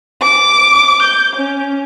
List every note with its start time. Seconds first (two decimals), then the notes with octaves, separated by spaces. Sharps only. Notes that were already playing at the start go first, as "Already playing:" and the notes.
0.22 D6
1.02 G6
1.36 C#4